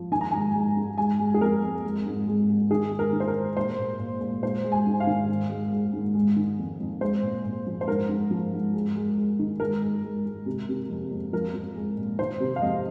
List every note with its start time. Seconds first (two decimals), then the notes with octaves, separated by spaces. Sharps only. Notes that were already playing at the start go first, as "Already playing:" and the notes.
Already playing: F3
0.12 D#3 G#5
0.21 A#5
0.31 G#2 G#5
0.54 G#3
0.76 G#2
0.98 G#3 G#5
1.19 G#3
1.34 G#4
1.41 F2 A#4
1.62 F2
1.83 G#3
2.06 G#2
2.28 G#3
2.49 G#3
2.70 D#3 G#4
2.91 G#3
2.99 A#4
3.13 D#3
3.20 C5
3.28 A#4
3.35 G#3
3.57 A#2 C5
3.78 A#2
3.99 A#2
4.21 A#2
4.42 G#3 C5
4.64 G#3
4.72 G#5
4.86 G#2
5.00 F5
5.07 D#3
5.29 G#2
5.50 G#3
5.72 G#3
5.93 G#2
6.15 G#3
6.36 D#3
6.59 F2
6.80 F2
7.01 G#3 C5
7.23 A#2
7.45 A#2
7.67 F3
7.81 C5
7.88 G#2 A#4
8.09 G#2
8.31 F3
8.52 G#2
8.74 G#3
8.96 G#3
9.17 G#3
9.39 D#3
9.60 G#3 A#4
9.82 G#3
10.04 G#3
10.26 G#3
10.46 C3
10.69 C3
10.89 F2
11.11 F2
11.33 F3 A#4
11.54 F3
11.75 G#3
11.97 A#2
12.19 D#3 C5
12.40 C3
12.56 F5
12.62 F2 D#5